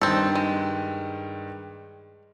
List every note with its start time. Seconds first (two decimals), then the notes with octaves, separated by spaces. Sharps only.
0.02 G2 D#3 C4 A4
0.35 G#3